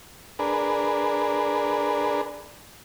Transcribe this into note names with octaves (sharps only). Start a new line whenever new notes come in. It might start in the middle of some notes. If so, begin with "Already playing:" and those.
D4 G#4 A#4 B4